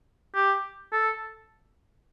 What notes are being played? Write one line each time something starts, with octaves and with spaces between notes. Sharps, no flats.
G4
A4